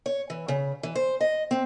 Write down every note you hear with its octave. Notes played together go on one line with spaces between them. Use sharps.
C#5
E3
C#3
E3
C5
D#5
C4